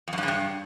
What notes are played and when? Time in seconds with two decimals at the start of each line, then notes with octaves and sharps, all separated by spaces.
0.08 F2
0.13 F#2
0.18 G2
0.23 C#3
0.28 G2